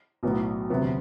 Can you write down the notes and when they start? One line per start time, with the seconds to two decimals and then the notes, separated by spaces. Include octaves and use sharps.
0.23 B1 A2 F#3 B3
0.70 E1 D2 C3 F#3 B3